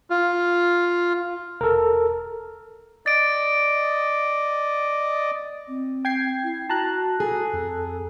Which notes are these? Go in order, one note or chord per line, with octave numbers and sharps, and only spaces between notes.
F4
E1 A4 A#4
D5 D#5 A6 D7
C4
G5 G#6 C7
E4
F#4 A5 A#5 F#6
G#4 A4
F2